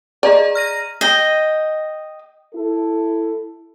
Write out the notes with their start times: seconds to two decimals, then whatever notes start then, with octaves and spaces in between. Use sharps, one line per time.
0.23 G#4 D5 D#5 A#5
0.55 F6 A#6 D#7
1.01 D#5 G5
2.53 E4 A4